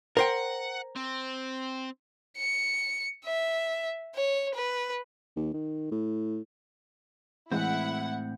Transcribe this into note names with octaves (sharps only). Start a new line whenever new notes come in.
A#4 C5 F#5 G5
C4
C#7
E5
C#5
B4
D#2
D#3
A2
A2 E3 G#3 C4 E4 F#5